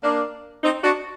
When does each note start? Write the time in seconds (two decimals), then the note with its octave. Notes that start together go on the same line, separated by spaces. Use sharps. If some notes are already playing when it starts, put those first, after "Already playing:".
0.03 A#3 D4
0.63 C4 D#4
0.84 D4 F#4